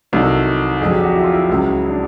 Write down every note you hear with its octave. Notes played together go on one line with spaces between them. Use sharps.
C2 C3 D#3 F#3 A4
F2 D3 F#3 G#4
G4
F#4
E4
F4
E4
C#2 C#3 F#3
D4